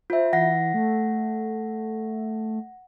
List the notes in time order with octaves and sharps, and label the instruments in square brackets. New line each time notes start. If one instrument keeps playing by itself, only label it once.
[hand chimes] F4 E5 [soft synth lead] C5
[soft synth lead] E3 [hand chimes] F#5 A#6
[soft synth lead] A3